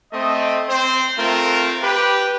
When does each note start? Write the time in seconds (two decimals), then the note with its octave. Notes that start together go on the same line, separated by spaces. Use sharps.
0.12 A3 C4 D#5
0.69 C4 C5
1.17 A3 C4 F4 A#4
1.83 G4 B4